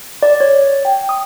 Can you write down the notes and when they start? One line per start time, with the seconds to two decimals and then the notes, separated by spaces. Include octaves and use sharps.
0.23 D5
0.41 C#5
0.85 G5
1.09 D#6